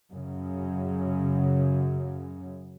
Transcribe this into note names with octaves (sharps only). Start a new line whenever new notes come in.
F#2 C#3